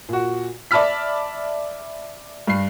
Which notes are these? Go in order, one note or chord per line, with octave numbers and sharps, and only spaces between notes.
A#2 F#4
D5 E5 A5 B5 F6 B6
G2 C7